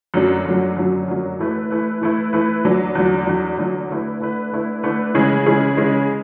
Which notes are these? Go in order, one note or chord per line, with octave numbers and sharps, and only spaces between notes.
F#2 D3 F#3
F#2 D3 F#3
F#2 D3 F#3
F#2 D3 F#3
E3 A3 E4 B4
E3 A3 E4 B4
E3 A3 E4 B4
E3 A3 E4 B4
E2 D3 F#3
E2 D3 F#3
E2 D3 F#3
E2 D3 F#3
D3 A3 E4 B4
D3 A3 E4 B4
D3 A3 E4 B4
D3 A3 E4 B4
C#3 E3 G#3 C#4 G#4
C#3 E3 G#3 C#4 G#4
C#3 E3 G#3 C#4 G#4